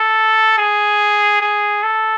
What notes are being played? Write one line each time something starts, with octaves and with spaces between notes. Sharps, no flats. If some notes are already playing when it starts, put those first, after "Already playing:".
Already playing: A4
G#4
G#4
A4